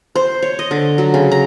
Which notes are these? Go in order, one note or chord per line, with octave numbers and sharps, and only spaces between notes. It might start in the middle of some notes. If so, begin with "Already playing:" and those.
C5
C#5
D#5
D3
F#3
C#3
A#5